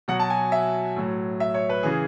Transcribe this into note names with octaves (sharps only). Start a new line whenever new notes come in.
B2 F#3 F#5
A5
G#5
E5
A2 F#3
E5
C#5
B4
C#3 E3 G#4